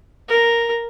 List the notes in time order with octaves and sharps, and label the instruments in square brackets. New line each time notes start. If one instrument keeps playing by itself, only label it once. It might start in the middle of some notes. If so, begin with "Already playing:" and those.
[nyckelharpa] A#4